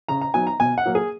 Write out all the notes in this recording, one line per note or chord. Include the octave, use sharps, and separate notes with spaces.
C#3 A#5
A#5
F#3 B3 D#4 G#5
A#5
B2 G#5
F#5
F#3 A#3
G#4